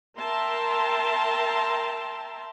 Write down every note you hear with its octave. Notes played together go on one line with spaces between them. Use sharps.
A#4 E5 G5 A5 A#5 C6